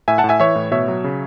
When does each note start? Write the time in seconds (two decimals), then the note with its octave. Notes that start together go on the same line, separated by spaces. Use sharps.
0.08 A2 E5 G#5
0.18 F#5 A5
0.24 A2
0.29 E5 G#5
0.40 E3 C#5 E5
0.56 A2
0.71 B2 C#5 E5
0.88 F#3
1.04 C#3